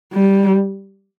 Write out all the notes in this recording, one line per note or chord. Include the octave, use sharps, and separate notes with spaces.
G3